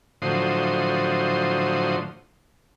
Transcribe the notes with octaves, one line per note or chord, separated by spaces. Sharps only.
A2 D3 F3 F#3 C5 D#6